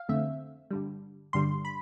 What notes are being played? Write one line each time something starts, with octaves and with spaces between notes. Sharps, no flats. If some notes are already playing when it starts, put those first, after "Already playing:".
Already playing: F5
F2 D3 A3 C4 E5
G2 D3 G3
G2 D3 G3 C6
B5